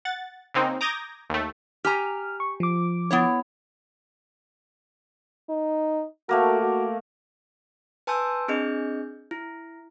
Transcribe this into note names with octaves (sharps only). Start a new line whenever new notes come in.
F#5 A6
C#3 A#3 C4 D#4
A#5 D6 D#6 G6 G#6 A#6
D#2 A3
G4 G#5 A#5 F6
C#6
F3 D6
B3 E4 C#5
D#4
A3 A#3 F#4 A#4
F#4
B4 G#5 A5 C6 E6 G6
C4 D4 G#4 D#5 G6
E4